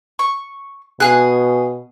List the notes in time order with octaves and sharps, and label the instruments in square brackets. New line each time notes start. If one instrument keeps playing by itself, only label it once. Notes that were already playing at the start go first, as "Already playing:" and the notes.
[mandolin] C#6
[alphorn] B2 [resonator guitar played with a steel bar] G#4 [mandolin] F5 G#5 F#6